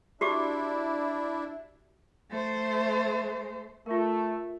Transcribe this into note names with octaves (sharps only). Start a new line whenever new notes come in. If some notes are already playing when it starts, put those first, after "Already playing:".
D4 E4 F#4 G4 D6
A3 C5
A3 F4 A#4